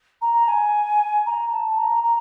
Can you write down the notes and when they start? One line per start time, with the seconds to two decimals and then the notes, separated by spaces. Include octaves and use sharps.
0.21 A#5
0.48 G#5
1.26 A#5
1.52 A5
1.77 A#5
2.03 A#5